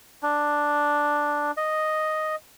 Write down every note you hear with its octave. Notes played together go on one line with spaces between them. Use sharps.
D4
D#5